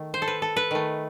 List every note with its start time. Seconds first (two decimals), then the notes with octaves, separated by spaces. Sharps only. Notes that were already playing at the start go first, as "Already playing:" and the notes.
Already playing: D#3 A3
0.14 C5
0.22 A4
0.28 B4
0.42 A4
0.56 B4
0.71 D#3 A3